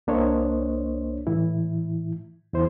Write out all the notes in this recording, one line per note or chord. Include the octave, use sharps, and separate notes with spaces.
C2 A#3 D4 C5 C#5 D#5
A2 E3 E4
E2 E4 C5